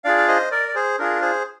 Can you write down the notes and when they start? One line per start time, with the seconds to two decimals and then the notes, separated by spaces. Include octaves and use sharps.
0.04 D4 F4 G#4 D5 F5
0.17 F5
0.28 C5 D#5
0.51 A#4 D5
0.68 D5
0.75 G#4 C5
0.99 D4 F4 G#4 A#4
1.22 G#4 C5